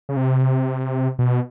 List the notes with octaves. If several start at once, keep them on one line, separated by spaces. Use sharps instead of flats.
C#3
C3
B2